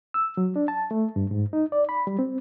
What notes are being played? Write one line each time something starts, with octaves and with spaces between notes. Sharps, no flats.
E6
F#3
D4
A5
A3
G2
G#2
D#4
D5
B5
G3
C4